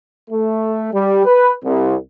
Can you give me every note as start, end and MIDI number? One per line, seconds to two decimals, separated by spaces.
0.30 0.91 57
0.93 1.25 55
1.25 1.53 71
1.64 1.95 36